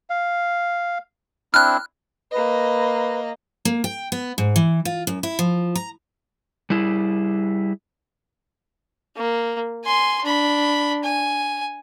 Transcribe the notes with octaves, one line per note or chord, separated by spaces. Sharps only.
F5
C4 D4 E4 F6 F#6
A#3 B4 D#5
A#3
G5
B3
G#2
E3
F4
F#2
E4
F3
A#5
G3 E4 G#4
A#3
G#5 C6
D4 B5
G#5